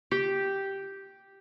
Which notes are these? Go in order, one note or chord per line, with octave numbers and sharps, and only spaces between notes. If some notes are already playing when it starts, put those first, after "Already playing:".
G4